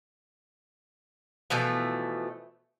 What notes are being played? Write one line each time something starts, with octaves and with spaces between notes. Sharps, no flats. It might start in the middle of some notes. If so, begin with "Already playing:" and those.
B2 E3 F3 A3